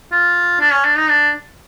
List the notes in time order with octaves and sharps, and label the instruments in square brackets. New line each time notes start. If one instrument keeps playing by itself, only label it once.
[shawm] F4
D4
C#4
D4
D#4
D4